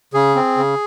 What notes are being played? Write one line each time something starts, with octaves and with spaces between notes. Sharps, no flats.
C#3 G#4
C4
C#3